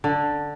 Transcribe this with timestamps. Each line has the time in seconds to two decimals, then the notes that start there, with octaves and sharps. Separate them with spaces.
0.04 D3